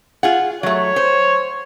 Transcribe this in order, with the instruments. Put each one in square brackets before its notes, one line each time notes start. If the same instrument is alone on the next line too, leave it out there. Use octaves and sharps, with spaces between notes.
[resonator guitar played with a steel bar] F4 G#4 F#5
[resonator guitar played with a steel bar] F#3 A3 [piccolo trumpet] C#5
[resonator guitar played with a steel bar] C5